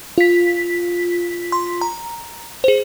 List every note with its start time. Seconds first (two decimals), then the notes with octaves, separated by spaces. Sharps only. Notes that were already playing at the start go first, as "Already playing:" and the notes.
0.18 F4 B6
1.52 C6
1.81 A#5
2.64 G#4 C5